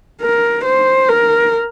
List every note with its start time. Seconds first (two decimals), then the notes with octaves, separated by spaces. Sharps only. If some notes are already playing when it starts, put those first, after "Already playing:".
0.22 A#4
0.64 C5
1.08 A#4